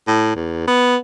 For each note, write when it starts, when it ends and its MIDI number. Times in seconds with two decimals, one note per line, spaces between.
0.07 0.32 45
0.36 0.64 40
0.67 0.96 59